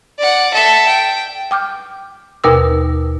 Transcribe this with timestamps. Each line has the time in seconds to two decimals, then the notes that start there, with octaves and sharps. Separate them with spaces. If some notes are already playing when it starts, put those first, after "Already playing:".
0.18 D5 F#5
0.54 A4 E5
0.87 G5
1.51 G5 D6 F6 G6
2.44 D#2 B2 A#4 D6 E6